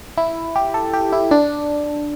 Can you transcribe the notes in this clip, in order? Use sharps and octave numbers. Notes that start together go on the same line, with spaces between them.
E4
G4
A4
G4
E4
D4